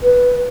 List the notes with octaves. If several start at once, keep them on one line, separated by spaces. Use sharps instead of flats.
B4